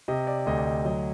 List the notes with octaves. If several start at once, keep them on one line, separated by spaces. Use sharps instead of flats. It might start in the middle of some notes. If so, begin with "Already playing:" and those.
C3 D#5
D5
D2 D#5
D5
D#5
F#3 D#5